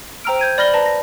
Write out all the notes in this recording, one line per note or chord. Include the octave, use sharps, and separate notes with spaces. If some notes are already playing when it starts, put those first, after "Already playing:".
C5 G5 A#5 E6 F6 D7
G6 G#6 D#7
D5 B5 F6 A#6 F#7 G7
B4 A5 A#5 A#6
A#6